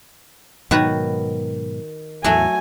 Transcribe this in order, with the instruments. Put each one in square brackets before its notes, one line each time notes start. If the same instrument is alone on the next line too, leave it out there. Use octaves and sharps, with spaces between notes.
[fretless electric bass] G#2 B2 F#3 [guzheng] D#3 F#4 B4
[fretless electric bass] E2 A2 [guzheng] F#3 A3 [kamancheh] G#5